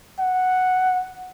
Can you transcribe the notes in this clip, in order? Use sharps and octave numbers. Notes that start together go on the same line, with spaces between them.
F#5